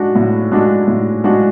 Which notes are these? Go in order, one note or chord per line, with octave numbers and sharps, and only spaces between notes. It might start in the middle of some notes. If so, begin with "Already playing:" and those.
Already playing: G#3 D4 F#4
A2
G#3 D4 F#4
A2
G#3 D4 F#4